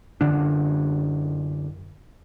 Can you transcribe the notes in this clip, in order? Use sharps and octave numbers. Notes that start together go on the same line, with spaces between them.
F#2 D3 D4